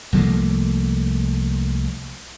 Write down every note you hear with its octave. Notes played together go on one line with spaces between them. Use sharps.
C2 F3 A3 A#3